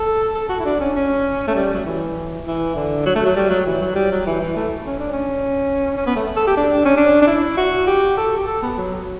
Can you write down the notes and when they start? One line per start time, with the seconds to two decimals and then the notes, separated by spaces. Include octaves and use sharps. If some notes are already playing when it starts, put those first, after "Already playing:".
Already playing: A4
0.35 A4
0.49 F#4
0.60 E4
0.65 D4
0.80 C#4
0.96 C#4
1.48 A3
1.55 G3
1.74 F#3
1.86 E3
2.46 E3
2.75 D3
3.06 F#3
3.16 A3
3.26 F#3
3.36 G3
3.51 F#3
3.67 E3
3.81 F#3
3.96 G3
4.12 F#3
4.26 E3
4.41 E3
4.56 A3
4.87 C#4
4.99 D4
5.13 C#4
5.97 C#4
6.07 B3
6.16 A3
6.36 A4
6.47 G4
6.57 D4
6.85 C#4
6.97 D4
7.22 D4
7.27 E4
7.57 F#4
7.87 G4
8.17 A4
8.37 G4
8.47 A4
8.62 B3
8.77 F#3